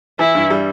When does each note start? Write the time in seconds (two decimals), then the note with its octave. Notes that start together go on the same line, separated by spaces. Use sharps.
0.19 E3 E4
0.35 G2
0.50 G3